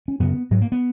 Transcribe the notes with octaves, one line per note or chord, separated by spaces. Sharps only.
C#4
F#2 C#3 B3
G#2 F#3
A#3
B3